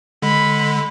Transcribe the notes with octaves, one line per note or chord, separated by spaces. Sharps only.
D3 G#3 B5